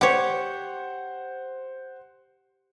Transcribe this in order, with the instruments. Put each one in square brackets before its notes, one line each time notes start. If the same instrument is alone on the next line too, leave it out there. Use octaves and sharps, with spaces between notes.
[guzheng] G4 C#5 [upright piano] C5 F#5